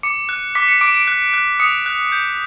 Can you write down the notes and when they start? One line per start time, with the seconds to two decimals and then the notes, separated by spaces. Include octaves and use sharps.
0.03 D6 C#7
0.29 F#6
0.55 D6 B6
0.68 C#7
0.81 D6 D7
0.94 D7
1.07 F#6
1.34 F#6
1.60 D#6 C#7
1.86 F#6
2.12 G6